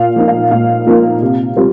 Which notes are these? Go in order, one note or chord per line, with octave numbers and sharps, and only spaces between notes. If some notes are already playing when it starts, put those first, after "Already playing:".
Already playing: A#2 F5
F3 A#3 D#4
F5
A#2 F5
F3 A#3 D#4
C3
G3 C4 F4